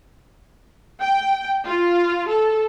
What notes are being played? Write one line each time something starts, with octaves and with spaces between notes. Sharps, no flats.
G5
F4
A4